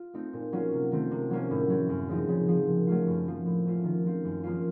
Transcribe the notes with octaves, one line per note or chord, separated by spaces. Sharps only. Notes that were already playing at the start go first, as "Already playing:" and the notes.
Already playing: F4
A3 C4 D#4
A#2
F#3 A#3 C#4 F4
C3
D#3 A3 C4
C3
F#3 A#3 C#4
A2
F#3 C4
F#2
C#3 F3 C4 D#4
C#3
F3 C4
A#2
F#3 A3 C#4 F4
F#2
F3 A#3
A2
A3 C#4 F4
D#3
F#3 C4 F4
F#2
F3 A#3 C#4 F4